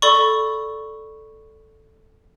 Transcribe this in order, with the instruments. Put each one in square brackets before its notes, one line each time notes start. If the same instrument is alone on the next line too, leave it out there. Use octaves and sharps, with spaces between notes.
[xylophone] A4 D5 B5 C#6